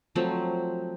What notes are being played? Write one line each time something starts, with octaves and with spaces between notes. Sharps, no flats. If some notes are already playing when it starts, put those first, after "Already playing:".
F3 F#3 A3 C4